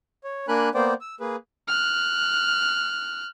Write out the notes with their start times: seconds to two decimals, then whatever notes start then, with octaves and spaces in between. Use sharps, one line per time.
0.24 C#5
0.48 A#3 D4 A#4 G#5 B5 F#6
0.74 A#3 B3 C5 D5 G5
1.01 E6
1.20 A#3 G#4 B4
1.68 F6 F#6